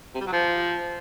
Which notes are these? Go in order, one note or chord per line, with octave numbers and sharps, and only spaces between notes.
C3
G3
F#3
F3